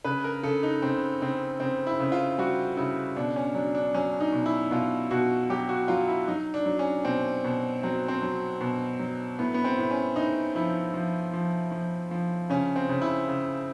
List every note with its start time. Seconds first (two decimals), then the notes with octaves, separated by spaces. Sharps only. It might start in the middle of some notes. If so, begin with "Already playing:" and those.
0.04 C#3 B4
0.24 A#4
0.43 C#3 A4
0.63 D#4
0.82 C#3 C4
1.22 C#3 C4
1.60 C#3 C4
1.87 E4
2.00 C#3
2.12 F4
2.38 G3 F#4
2.77 C#3 E4
3.17 B2 D4
3.36 C#4
3.54 F#3 D4
3.75 D4
3.94 F#3 C#4
4.20 D#4
4.33 B2
4.46 E4
4.71 B2 F4
5.11 B2 F#4
5.49 F#3 G4
5.69 F#4
5.88 F#3 F4
6.08 E4
6.28 F#3 D#4
6.54 D4
6.66 F#3
6.79 C#4
7.05 B2 C4
7.45 B2
7.83 F#3 C4
8.08 C4
8.22 F#3
8.61 B2
8.99 F#3
9.39 A2 B3
9.54 B3
9.64 C4
9.78 A2
9.91 C#4
10.16 A2 D#4
10.55 F3 E4
10.94 F3
11.33 F3
11.71 F3
12.11 F3
12.50 C#3 C#4
12.76 C4
12.89 C#3
13.02 E4
13.28 C#3